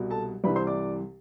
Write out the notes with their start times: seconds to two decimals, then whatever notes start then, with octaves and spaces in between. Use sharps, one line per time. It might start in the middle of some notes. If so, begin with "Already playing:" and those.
Already playing: C2 B2
0.10 A4 A5
0.44 C2 C3 E3 B4 B5
0.55 C5 C6
0.67 D5 D6